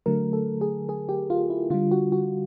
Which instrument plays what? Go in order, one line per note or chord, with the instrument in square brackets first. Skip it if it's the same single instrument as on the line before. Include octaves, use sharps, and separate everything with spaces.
[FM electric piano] D3 F#3 A3 A#4
A4
G#4
G#4
G4
F4
E4
D3 G3 F4
F#4
F#4